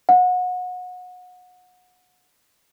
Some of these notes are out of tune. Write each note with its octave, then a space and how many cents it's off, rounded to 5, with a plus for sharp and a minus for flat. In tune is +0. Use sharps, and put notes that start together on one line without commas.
F#5 -30